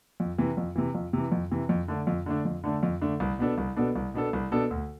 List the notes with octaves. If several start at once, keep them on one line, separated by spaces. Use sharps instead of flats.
F2
C3 E3
F2
C3 E3
F2
C3 E3
F2
C3 E3
F2
D3 A3 D4
F2
D3 A3 D4
F2
D3 A3 D4
F2
D3 A3 D4
C2
B2 B3 D4 A4
C2
B2 B3 D4 A4
C2
B2 B3 D4 A4
C2
B2 B3 D4 A4
D2